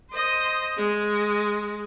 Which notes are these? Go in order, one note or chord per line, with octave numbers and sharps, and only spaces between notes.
C5 D#5
G#3